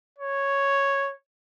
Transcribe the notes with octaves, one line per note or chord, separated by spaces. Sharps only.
C#5